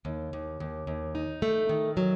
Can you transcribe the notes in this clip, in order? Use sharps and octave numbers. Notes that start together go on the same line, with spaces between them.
D#2
D#2
D#2
D#2
D#4
A3
D#3
F#3